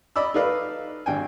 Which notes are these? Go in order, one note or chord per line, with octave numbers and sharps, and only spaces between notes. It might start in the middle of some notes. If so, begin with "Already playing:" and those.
D5 D#5 B5 D6 E6
D#4 A4 B4 D5 F5
G#1 D4 G5 G#5